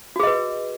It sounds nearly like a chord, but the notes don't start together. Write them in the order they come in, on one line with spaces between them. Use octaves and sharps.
F#4 G#4 D#5 B4